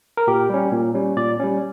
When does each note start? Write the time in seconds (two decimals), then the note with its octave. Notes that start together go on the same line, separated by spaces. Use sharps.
0.17 A#4
0.27 A#2 G4
0.49 G3 C#4
0.72 A#2
0.94 G3 C#4
1.17 A#2 D5
1.39 G3 C#4